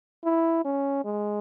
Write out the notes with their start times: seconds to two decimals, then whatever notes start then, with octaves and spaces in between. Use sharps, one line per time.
0.24 E4
0.65 C#4
1.05 G#3